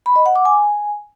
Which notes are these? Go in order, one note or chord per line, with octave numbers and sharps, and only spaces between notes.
B5
D#5
F#5
D6
G#5